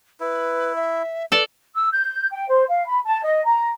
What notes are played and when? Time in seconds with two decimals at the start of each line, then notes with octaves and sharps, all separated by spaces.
0.20 E4 B4
0.76 E5
1.32 A4 B4 D5
1.75 E6
1.92 G6
2.31 G5
2.48 C5
2.68 F5
2.86 B5
3.04 A5
3.23 D#5
3.45 A#5